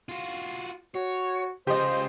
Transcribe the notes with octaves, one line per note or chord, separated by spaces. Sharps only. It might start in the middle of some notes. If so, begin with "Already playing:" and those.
F4 F#4
F#4 C#5
C#3 F4 G4 C5 D#5